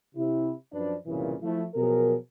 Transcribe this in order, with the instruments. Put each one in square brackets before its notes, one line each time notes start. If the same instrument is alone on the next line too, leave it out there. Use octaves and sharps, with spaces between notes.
[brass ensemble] C3 E4
F#2 F3 D4 B4 D5
C2 F#2 A#2 C#3 E3
F3 A3 E4
B2 F3 F#3 G#4 A#4